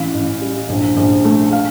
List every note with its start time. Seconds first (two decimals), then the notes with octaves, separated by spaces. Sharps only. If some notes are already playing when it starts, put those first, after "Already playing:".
Already playing: A1 E3 F5
0.14 A1
0.42 G3
0.69 A#1
0.97 A#1
1.25 A3
1.52 F5